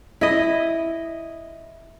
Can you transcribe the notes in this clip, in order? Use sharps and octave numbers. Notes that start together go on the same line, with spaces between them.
E4 D#5